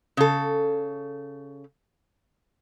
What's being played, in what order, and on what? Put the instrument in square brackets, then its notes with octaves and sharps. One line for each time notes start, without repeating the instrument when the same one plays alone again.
[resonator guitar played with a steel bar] C#3 A4